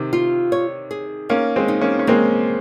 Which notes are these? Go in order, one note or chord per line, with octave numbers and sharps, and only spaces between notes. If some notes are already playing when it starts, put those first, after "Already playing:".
Already playing: C3 D#3
F4
C#5
G#4
A#3 C#4 D#4
G#3 C4
D#4
A#3 C#4
C#4
G#3 A#3 C4